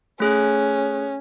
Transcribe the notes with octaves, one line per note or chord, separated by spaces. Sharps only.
A3 C#4 G#4 F#6